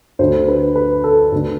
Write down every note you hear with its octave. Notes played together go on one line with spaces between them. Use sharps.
D2 D3 C5
B4
B4
A4
D2 D3